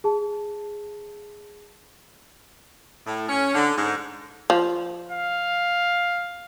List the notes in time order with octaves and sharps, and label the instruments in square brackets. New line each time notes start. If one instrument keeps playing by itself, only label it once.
[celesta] G#4 A5
[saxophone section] A2
C#4
D3
G#2
[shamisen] F3
[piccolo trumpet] F5